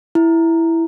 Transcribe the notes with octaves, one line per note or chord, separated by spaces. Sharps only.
E4